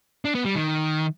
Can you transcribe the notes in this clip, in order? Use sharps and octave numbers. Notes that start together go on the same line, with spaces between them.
D4
B3
G3
D#3